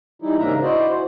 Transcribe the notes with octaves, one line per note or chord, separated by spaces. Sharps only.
E3 G3 D#4 E4
G#2 C#3 A#3 D4 E5 A#5
E4 F#4 C5 D5 D#5
E3 C5